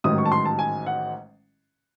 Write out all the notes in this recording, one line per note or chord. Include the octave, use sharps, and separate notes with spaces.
A1 G#2 D#3 F#3 D#6
C#6
A5
C6
A5
G#5
F#5